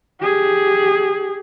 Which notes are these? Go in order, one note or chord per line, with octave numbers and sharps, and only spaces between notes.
G4 G#4